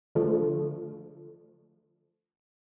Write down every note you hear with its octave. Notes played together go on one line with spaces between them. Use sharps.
D3 F3 A3